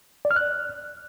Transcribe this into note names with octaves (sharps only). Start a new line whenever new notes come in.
D5
F6
F#6